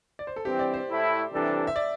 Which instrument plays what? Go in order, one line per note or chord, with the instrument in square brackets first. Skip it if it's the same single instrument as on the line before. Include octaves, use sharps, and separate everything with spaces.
[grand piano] D5
C5
A4
[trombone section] G2 E3 C4 [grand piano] G4
[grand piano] D5
C5
[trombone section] A2 A3 E4
C3 E3 G3 D4 A4
[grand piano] E5
D5